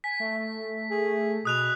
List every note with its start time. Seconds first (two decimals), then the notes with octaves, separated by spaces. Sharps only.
0.04 G#5 B6
0.20 A3
0.91 G#4
1.45 B2 D#6 F#6 F7